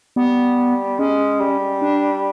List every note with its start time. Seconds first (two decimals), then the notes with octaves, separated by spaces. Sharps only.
0.16 G3 B3
0.99 G#3 C#4
1.40 G3
1.82 D4